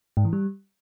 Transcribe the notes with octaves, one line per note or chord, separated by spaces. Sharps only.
G#2
E3
G3